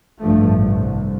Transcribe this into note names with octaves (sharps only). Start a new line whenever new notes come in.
A1 G2 F3 A3
C2